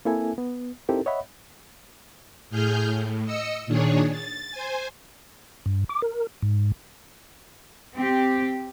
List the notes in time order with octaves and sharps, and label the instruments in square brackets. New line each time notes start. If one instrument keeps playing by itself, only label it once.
[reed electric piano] A#3 C4 E4 A4 E5 G#5
B3
C4 D#4 E4 G4 A4 A#4
C#5 D#5 E5 F#5 B5
[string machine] A2 G#4 F6 G6
A2
D#5 E6 C#7
A#2 D#3 D4 G#4 C#5
A6
C5 G#5
[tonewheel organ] G2
D6
A#4
G#2
[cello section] C4 G4